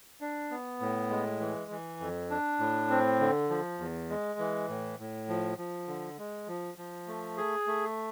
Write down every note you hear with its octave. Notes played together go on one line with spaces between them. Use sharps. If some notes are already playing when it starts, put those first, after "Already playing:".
D4
B3
A2
G#3
E3
E3
F2
D4
A2
C4
D3
F3
E2
G#3
E3
A2
A2
F3
F3
D3
G#3
F3
F3
A3
G#4
A3